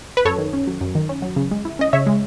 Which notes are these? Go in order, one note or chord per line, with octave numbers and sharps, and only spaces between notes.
B4
F#2 A4 C#5
D#3
C#4
F#3
F#2
D#3
C#4
F#3
C#3
G#3
E4
C#4 D#5
C#3 C#5 E5
G#3